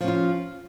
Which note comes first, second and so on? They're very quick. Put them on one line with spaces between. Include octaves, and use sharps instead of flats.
F3 C#4 F4